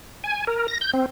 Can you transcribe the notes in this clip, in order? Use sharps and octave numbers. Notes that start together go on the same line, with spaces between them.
G#5
A#4
A#6
G6
C4